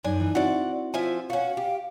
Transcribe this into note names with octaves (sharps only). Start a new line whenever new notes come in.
F#2 D4 D#4 G#5
E3
C4 E4 F#4 D5 F#5
F3 F4 E5 G#5
C#4 F#4 F5
G4